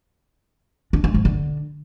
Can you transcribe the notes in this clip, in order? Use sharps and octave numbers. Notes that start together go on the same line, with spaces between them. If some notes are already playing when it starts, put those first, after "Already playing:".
D4
G#3
F3
D3